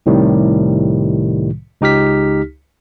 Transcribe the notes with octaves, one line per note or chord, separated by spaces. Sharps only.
C2 A2 C3 D#3 G3
C#2 D#4 G4 F6 B6